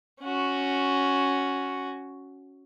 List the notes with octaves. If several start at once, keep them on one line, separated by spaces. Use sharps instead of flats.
C#4 F#4